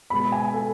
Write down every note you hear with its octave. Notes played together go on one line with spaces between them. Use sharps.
B2 G#3 B3 B5
G#5
A4